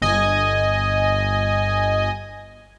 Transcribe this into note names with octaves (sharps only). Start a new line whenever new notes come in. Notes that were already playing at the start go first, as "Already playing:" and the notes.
G1 D#5 G#5